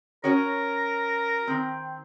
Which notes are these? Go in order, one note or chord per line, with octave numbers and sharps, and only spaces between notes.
C#4 F#4 A#4 C#5
D#3 C4